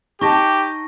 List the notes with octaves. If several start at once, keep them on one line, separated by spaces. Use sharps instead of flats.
D#4 G4 A5 C#6 A#6